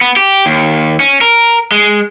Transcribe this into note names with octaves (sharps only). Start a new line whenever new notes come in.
B3
G4
D#2
C#4
A#4
G#3